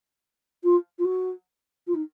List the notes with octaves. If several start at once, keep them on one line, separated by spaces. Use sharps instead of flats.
F4
F4
F#4
F4
D#4